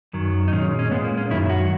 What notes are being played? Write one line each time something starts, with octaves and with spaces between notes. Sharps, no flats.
F#2 D#3 F#3
D#4
A#2 G#3 C#4
C#4
A#2 G#3 B3
A#3
C#4
F#2 D#3 F#3 E4
F#4